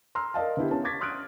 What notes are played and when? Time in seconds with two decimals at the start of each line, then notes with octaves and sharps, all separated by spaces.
0.15 A#5 C6 E6 F6
0.34 A#4 D5 D#5 F5 A5
0.57 D3 B3 E4 G4
0.70 B3 C#4 A5
0.84 C#6 D6 G#6 A6 B6
1.01 C6 D#6 F6 F#6 G#6 D7